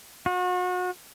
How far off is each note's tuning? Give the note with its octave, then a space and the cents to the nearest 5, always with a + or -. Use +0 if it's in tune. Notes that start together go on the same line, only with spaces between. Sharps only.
F#4 -35